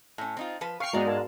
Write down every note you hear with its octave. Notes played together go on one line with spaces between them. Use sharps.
A2 C#4
C4 D#4 F4
F3 B4
B4 F5 G5 C#6 F6 C7
G#2 G#3 B3 F#4 D5 A#5
A#4 F5 A5